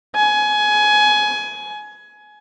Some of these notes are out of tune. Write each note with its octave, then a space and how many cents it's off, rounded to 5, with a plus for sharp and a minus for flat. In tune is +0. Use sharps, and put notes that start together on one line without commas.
G#5 +20